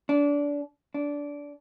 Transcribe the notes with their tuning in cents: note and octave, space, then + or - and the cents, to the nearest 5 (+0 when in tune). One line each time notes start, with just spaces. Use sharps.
D4 -25
D4 -20